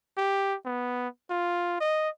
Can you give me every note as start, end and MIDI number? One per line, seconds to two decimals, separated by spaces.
0.17 0.55 67
0.65 1.08 59
1.30 1.80 65
1.80 2.09 75